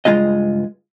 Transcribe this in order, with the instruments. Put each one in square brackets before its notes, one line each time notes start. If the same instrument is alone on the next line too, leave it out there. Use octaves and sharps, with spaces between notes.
[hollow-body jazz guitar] C#2 G2 G#3 F4 G#4 D#5